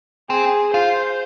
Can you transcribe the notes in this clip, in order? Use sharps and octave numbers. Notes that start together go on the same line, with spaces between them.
C4 G#4
F4 C5